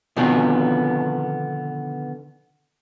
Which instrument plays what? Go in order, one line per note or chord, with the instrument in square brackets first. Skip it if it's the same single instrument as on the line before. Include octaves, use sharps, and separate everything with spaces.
[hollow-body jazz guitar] B2 D3 D#3 F3 B3 C4